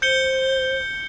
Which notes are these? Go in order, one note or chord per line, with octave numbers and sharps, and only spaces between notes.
C5 G6 C#7 G7